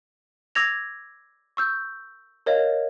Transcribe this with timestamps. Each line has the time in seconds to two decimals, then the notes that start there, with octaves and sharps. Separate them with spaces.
0.55 D6 E6 G#6 A#6 F7
1.57 C#6 E6 G6
2.46 A#4 C#5 D#5 F5